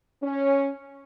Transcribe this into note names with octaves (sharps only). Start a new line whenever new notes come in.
C#4